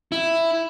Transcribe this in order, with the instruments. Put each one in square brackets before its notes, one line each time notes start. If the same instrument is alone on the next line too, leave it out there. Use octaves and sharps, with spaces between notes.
[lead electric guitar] E4